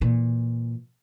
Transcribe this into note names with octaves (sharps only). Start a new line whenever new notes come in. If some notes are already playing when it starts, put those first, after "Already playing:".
A#2 E3